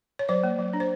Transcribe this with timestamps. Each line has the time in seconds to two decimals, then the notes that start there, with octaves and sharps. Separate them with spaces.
0.19 C#5
0.29 F#3 C5 D5
0.44 A#3
0.59 F#3
0.73 D4
0.80 C5